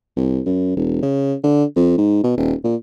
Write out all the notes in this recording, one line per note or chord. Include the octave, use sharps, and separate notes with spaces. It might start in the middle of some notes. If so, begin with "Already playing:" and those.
C2
F#2
E1
C#3
D3
F2
G#2
B2
D#1
A#2